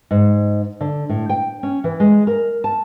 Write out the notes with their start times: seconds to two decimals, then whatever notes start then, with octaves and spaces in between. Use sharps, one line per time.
0.11 G#2
0.81 D3
1.09 A2
1.29 G5
1.63 C#4
1.84 E3
2.00 G#3
2.27 A#4
2.64 A5